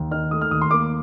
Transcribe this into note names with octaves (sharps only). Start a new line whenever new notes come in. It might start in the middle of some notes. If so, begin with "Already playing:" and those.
Already playing: D#2
D#3 F6
A3 D#6
F6
D#2 D#6
C6
A#3 D6